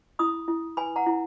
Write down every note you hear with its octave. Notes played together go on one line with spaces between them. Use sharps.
E4 B5 D#6
E4
B4 G#5 B5
F#5 A#5
E4